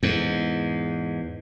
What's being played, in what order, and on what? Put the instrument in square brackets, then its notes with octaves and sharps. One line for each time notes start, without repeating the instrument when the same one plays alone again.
[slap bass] E2 G#2